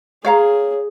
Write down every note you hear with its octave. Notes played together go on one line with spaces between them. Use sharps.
G#4 C#5 F5 A#5